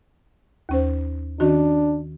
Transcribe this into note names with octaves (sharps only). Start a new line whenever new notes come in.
D#2 C#4 C5
D#3 C#4 D4 F#4